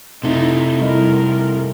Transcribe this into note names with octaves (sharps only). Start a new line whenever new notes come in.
C3 A3 D#4 E4
G3 E4 A#4 D#5